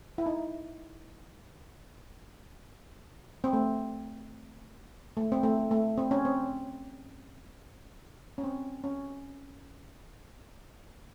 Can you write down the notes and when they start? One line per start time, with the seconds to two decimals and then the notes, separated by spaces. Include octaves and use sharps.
0.18 E4
0.26 D#4
3.44 C4
3.53 A3
5.17 A3
5.32 C4
5.43 A3
5.71 A3
5.98 C4
6.11 C#4
6.25 C4
8.38 C#4
8.43 C4
8.84 C#4